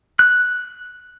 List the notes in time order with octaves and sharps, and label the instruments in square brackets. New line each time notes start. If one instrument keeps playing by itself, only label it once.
[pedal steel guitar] F#6